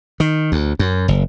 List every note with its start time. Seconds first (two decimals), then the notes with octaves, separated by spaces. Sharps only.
0.20 D#3
0.52 D2
0.79 F#2
1.08 F#1